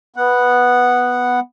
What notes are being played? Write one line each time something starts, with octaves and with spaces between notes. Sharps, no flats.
B3 F#5